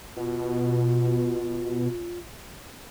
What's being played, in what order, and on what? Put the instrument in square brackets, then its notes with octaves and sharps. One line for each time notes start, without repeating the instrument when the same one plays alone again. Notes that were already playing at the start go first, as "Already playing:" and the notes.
[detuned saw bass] B2 [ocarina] F4